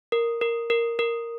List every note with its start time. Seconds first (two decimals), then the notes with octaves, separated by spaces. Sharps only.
0.12 A#4
0.41 A#4
0.70 A#4
0.99 A#4